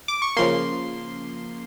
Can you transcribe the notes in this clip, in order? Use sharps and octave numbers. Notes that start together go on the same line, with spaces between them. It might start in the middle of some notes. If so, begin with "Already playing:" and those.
D6
C#6
C#3 F3 A#3 C6